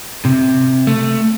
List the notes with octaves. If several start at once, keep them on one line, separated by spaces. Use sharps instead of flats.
C3
A3